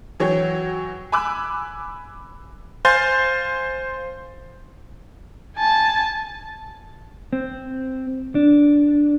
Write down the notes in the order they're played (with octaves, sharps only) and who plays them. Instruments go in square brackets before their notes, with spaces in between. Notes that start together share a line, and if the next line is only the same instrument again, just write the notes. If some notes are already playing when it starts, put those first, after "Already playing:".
[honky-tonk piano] E3 F#3 C#5 G5
G#5 B5 D6 E6 F#6
[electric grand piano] C5 F5 G#5 C6 G6 A6
[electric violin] G#5 A5
[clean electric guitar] C4
D4